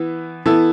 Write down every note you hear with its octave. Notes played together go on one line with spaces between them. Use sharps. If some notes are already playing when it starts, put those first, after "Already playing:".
Already playing: E3 B3 E4
E3 B3 E4 A4